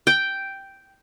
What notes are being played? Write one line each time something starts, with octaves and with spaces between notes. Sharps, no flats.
G5